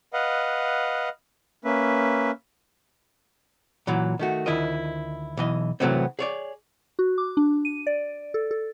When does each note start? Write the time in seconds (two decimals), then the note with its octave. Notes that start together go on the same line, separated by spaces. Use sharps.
0.13 B4 D#5 F5 F#5
1.65 A#3 C#4 B4 E5
3.87 A#2 E3 F#3
4.19 D#3 A3 F#4
4.46 D2 D#3 E4 F4 A#4 D#5
5.37 B1 E3 D#5
5.80 C3 E3 F#3 A3 B3 C4
6.19 G#4 C#5 D5
6.99 F#4
7.18 D6
7.37 D4
7.65 D#7
7.87 D5
8.34 A4
8.51 A4